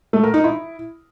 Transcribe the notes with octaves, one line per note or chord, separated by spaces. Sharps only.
A3
A#4
D#4
E4